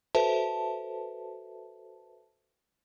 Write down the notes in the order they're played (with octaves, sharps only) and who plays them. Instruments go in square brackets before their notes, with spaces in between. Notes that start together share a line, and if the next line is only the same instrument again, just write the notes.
[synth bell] F#4 A4 B4 C5 E5 A5